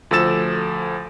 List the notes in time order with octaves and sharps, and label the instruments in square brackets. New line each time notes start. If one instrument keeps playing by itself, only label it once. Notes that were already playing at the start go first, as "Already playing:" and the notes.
[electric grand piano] D2 F3 A4 E6 A6 E7